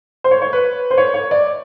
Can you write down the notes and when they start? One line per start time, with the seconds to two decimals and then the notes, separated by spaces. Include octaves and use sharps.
0.24 C5
0.31 C#5
0.42 C#5
0.53 B4
0.91 C5
0.98 C#5
1.14 C#5
1.31 D5